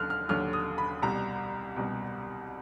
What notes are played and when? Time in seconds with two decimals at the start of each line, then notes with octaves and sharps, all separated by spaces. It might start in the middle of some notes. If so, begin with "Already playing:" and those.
Already playing: D#2 D3 F#3 F6 F#6
0.10 F6
0.29 D#2 D3 F#3 F6
0.53 D#6
0.78 B5
1.02 C2 B2 G3 A#5
1.76 C2 B2 G3